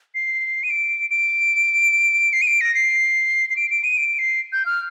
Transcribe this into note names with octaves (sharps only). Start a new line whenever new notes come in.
C7
D#7
D7
D7
C7
D#7
D7
A#6
C7
C7
D7
D7
D#7
D7
C7
G6
F6